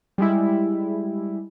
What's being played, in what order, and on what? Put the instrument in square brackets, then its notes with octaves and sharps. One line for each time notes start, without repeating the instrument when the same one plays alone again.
[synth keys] G3 G#3 E4